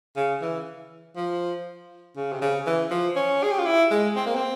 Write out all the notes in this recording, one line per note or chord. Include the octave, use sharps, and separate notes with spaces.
C#3
E3
F3
C#3
C3
C#3
E3
F3
C#4
G#4
G4
F4
E4
G#3
C4
A#3
C4